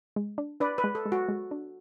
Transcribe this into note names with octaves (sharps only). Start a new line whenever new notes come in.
G#3
D4
D4 B4 D5
B4
G#3
A4
G#3
F#4
G#3
D4